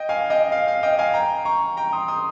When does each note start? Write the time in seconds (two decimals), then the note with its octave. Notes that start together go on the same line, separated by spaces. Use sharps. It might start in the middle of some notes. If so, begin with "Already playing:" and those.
Already playing: D#5 G5
0.09 F5 G#5
0.30 D#5 G5
0.52 F5
0.68 F5
0.83 D#5 G5
0.99 F5 G#5
1.14 G5 A#5
1.45 A#5 C#6
1.77 G5 A#5
1.93 C6 D#6
2.08 C6 D#6